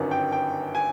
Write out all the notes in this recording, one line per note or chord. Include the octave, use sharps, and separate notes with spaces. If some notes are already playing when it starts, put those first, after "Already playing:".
Already playing: G1 F#2 D#3
G5
G5
G#5